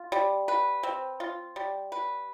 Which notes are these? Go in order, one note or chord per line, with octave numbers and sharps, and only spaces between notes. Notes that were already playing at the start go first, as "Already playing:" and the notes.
Already playing: F4
G3
B4
C4
F4
G3
B4